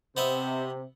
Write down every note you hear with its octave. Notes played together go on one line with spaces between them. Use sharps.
C3 B3 C5 D#5 E5